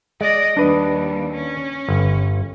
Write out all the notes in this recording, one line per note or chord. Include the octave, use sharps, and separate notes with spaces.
G#3 D5 D#5
D#2 G3 D4 B4 D#5
C#4
G1